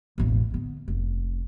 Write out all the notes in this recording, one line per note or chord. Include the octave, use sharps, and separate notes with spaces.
E1 A1
D3 B3
F1